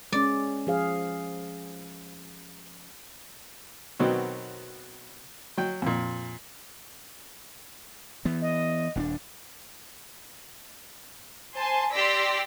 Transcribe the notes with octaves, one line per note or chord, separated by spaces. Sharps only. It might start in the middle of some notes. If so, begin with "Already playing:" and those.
G#3 C#4 D5
F3 G#4 F5
B2 D#3 F#3 B3 C4
F#3 G5
F2 A#2
E3 B3
D#5
D#1 C#4 D4
C5 G#5 A5 C6
G4 D5 C6 E6 A#6 B6